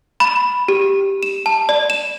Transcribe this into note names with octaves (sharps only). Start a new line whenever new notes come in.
B5
G4
E7
A5
D5
E7